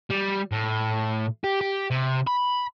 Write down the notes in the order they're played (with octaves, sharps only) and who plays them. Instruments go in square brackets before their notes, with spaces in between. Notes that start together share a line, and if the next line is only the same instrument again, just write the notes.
[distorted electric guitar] G3
A2
G4
G4
C3
B5